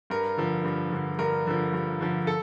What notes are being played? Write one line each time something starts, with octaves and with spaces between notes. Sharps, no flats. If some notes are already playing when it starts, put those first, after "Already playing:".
G2 A#4
D3 F3
G2
D3 F3
G2 A#4
D3 F3
G2
D3 F3
A4